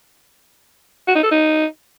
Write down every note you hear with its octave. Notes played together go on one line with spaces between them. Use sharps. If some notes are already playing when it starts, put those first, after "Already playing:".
F#4
D#4
A4
D#4